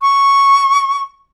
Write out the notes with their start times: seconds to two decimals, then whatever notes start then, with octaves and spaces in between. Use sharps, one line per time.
0.01 C#6